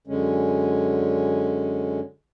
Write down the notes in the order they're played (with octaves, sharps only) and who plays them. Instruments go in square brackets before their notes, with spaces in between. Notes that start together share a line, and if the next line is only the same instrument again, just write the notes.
[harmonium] F#2 D3 G#3 C#4